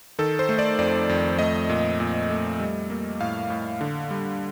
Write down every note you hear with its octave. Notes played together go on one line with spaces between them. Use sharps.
D#3 A4
C5
A3
D5
F2 D5
F2
A3 D#5
A#2
A#2
A3
G3
A#3
A2 F5
A2
D3
G3